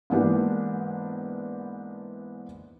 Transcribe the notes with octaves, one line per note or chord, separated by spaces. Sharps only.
G#2 E3 A#3 B3 D4 G4